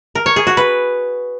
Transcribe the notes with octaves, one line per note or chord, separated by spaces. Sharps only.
A#4
C#5
G#4
F#4
B4